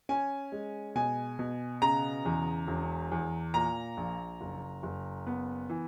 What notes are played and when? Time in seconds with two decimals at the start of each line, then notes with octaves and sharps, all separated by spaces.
0.09 C#4 G#5
0.52 G#3
0.95 B2 G#5
1.39 B2
1.82 C#3 A#5
2.25 E2
2.67 E1
3.12 E2
3.54 A#2 A#5
3.97 A#1
4.41 F#1
4.83 F#1
5.27 B3
5.69 E3